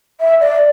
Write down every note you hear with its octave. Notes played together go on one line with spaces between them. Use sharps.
E5
D5